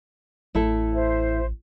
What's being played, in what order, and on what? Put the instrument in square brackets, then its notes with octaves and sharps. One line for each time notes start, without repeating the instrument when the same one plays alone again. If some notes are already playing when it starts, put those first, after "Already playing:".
[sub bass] A1 [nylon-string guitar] A2 E4 A4
[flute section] C5 E5